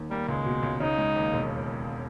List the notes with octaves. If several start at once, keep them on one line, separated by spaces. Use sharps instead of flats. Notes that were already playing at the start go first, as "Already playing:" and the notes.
Already playing: D#2
G3 A#3
C#2 G#3
B2
C#2
C#3 D#4
G#3
D#2
E1